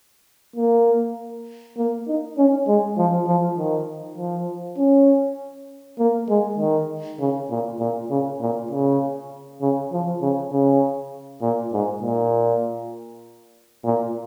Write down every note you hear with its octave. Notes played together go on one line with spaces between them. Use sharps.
A#3
A#3
D#4
C#4
G#3
F3
F3
D#3
F3
C#4
A#3
G#3
D#3
C#3
A#2
A#2
C#3
A#2
C#3
C#3
F3
C#3
C#3
A#2
G#2
A#2
A#2